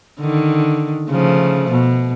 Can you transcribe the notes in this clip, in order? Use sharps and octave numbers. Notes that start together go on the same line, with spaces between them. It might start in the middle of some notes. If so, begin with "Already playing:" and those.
D3 D#3
C#3 F3 A3
B2